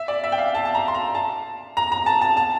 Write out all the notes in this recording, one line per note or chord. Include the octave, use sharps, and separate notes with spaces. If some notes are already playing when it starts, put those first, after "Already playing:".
Already playing: E5
D5
E5
G5
F5
A5
A5
A#5
C6
A#5
A5
A#5
A#5
A5
A5
A5